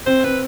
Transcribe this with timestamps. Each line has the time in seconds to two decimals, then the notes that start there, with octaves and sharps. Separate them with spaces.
0.06 C4 C5
0.24 C4 B4